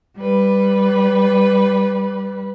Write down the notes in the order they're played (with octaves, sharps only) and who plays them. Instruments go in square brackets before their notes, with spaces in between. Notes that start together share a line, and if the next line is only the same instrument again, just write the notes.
[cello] G3 B4